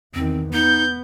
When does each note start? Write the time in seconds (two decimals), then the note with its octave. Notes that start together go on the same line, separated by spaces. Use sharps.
0.15 E2 D#3 C4
0.53 B3 D#4 G6